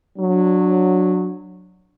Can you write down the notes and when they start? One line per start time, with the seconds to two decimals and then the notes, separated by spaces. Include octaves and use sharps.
0.18 F#3 D4